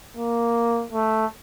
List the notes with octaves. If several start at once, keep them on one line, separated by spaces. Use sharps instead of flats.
A#3
A3